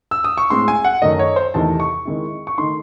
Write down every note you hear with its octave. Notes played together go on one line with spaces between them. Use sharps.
E6
D#6
C#6
A2 G#3 C4 C6
G#5
F#5
F#2 D#3 A3 D#5
C#5
C5
E2 C3 D#3 A3 D#4 A5
C#6
D#3 G#3 C4 E4
C#6
D#3 A3 D#4 C6